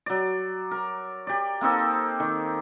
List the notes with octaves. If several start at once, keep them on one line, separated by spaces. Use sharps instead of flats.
F#3 D5
A#4
G4 D5
A#3 C4 D#4 A4
D#3